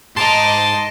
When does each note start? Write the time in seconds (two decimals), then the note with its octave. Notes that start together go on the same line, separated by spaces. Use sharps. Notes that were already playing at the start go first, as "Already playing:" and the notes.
0.16 G#2 D#5 A5 A#5 C6 D6